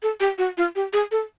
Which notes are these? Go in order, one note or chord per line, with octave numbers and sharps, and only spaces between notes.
A4
G4
F#4
F4
G4
G#4
A4